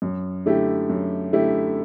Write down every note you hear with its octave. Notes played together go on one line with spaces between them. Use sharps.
F#2
D3 A3 E4 G4
F#2
D3 A3 E4 G4